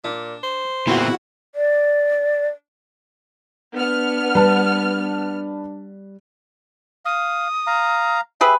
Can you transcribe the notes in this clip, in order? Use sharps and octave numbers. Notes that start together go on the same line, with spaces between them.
A#2 D4
C5
E2 A#2 C4 E4 F#4 F#5
D5
B3 D4 F6
G3 B4 A5
F5 D#6
F5 A#5
G4 G#4 B4 E5